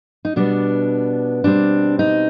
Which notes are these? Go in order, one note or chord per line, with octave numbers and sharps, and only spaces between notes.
D#4
B2 G3 B3 D4
B2 G3 C4 D4
D#4